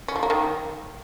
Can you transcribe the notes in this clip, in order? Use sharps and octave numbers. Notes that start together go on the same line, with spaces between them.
C#4
F3
A#3
D#3